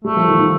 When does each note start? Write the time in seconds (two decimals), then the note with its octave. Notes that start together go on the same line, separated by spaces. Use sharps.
0.05 G3 A3
0.17 F3
0.28 D#3
0.40 D#3